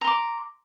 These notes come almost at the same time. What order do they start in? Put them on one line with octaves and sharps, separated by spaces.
A#5 C6 D6